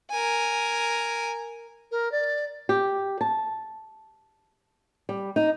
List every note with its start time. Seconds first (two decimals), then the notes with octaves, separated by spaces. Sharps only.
0.11 A#4 G#5
1.91 A#4
2.12 D5
2.69 G4
3.21 A5
5.09 G3
5.36 D#4